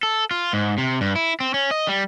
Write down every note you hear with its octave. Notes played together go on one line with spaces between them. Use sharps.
A4
F4
G#2
C3
G2
E4
C4
C#4
D#5
G3